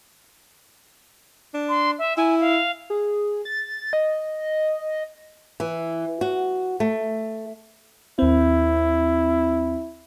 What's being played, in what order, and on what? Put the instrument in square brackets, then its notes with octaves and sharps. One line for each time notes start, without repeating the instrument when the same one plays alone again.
[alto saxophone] D4
[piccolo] C6
E5
[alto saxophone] E4 [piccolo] G#5
[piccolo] F5
[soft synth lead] G#4
A6
D#5
[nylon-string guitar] E3
F#4
A3
[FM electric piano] D#2 C4 [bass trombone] E4